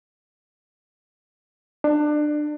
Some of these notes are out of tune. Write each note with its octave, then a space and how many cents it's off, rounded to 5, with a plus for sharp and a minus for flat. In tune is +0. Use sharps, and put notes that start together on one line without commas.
D4 +25